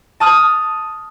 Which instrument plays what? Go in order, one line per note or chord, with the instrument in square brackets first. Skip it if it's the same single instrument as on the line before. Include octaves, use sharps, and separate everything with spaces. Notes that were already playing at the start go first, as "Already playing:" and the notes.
[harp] A5 D#6 F6